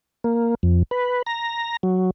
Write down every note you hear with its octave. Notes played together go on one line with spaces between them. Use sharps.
A#3
F2
B4
A#5
F#3